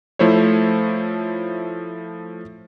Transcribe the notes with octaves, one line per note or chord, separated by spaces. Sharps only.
F3 A3 E4 C5 C#5